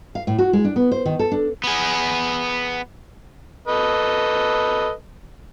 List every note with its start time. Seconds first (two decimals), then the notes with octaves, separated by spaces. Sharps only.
0.15 F5
0.27 A2
0.38 F#4
0.53 G#3
0.64 D4
0.76 B3
0.91 C5
1.05 D#3
1.19 A4
1.32 D4
1.64 B3 G#4
3.68 A4 B4 D#5